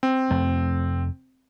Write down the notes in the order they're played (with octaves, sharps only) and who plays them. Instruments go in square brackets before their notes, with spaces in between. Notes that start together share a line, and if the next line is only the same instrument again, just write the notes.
[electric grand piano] C4
[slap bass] F1 F2 A3